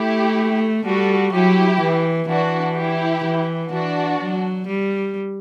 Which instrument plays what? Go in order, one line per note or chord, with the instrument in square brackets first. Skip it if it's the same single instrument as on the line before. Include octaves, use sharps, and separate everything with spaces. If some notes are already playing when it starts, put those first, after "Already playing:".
Already playing: [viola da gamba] A3 [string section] E4 G4
[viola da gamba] G3 [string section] F#4 A4
[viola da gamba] F#3 [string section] E4 G4
[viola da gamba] E3
[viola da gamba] E3 [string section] D4 F#4
[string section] E4 G4
[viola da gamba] E3
[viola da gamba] E3 [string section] D4 F#4
[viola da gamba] F#3
G3